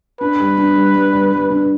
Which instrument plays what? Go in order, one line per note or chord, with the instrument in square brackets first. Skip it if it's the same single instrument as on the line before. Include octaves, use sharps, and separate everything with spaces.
[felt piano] D4 [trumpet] B4
[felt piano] G3
D4
G3
G3
G3
G3
D4